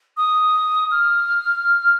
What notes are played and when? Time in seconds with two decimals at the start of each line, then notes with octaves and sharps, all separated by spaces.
0.17 D#6
0.91 F6